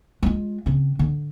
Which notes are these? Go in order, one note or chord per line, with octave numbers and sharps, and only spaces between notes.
G#3 F4
C#3 C4
D3